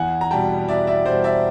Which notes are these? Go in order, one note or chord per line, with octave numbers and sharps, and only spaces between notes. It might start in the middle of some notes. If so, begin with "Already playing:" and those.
Already playing: E2 F#5 G#5
A#5
B2 G3 G5 A5
E2 D5 E5
D5 E5
B2 G3 C5 D5
D5 E5